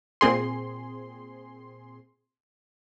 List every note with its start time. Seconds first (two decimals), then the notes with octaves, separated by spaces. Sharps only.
0.21 A#2 C4 G#4 C6